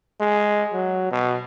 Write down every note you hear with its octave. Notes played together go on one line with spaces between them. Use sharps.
G#3
F#3
B2